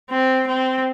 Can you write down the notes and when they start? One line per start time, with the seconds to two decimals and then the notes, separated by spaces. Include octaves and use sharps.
0.10 C4
0.47 C4